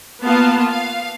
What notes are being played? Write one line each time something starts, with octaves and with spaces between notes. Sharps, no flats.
A#3 B3 F4 F5 A5
F5